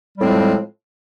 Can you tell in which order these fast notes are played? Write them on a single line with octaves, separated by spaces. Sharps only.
G3 A2 C4 G#3 F3